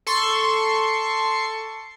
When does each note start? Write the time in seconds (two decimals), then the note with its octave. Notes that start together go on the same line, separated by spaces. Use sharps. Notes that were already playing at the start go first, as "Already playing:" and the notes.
0.07 A4 C6 C#6